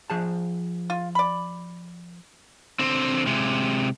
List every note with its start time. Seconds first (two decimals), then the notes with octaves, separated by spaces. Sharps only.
0.10 F3 G#4 A5
0.90 F4
1.15 D5 B5
2.79 D3 C4
3.26 C3 G#3